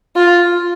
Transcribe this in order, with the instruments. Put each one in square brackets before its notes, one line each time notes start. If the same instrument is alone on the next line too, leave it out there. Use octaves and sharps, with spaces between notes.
[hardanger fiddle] F4